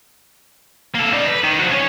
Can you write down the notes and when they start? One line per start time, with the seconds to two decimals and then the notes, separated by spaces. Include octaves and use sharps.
0.95 A#3 A4
1.13 D#4 D5
1.27 B4
1.43 D#3
1.59 F3 F#4
1.71 C#4 C#5